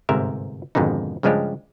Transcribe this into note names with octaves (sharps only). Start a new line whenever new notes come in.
G1 G#2 C3 A#4 E5
G#1 F2 G#2 B2 D3 D#4
G2 C#3 F3 G#3 D4 G4